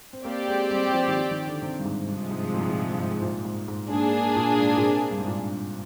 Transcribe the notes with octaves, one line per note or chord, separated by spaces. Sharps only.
C4
A#3 C4 G4 D5
G#3
G3
G3
F3
D#3
F3
D#3
D3
C3
G2
G#2
G2 C3 F3 G#3
G#2
A#2
G#2
A#2
G2
G#2
G#2
A#2
G#2
G#2
G#2 A#3 D4 G#4
A#2
G#2
A#2
C3
G2
G#2
A#2